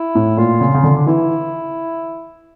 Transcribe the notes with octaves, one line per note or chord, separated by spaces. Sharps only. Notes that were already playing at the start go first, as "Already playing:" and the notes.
Already playing: E4
A2
A#2 F4
C#3
C#3
D3
D4
E3 E4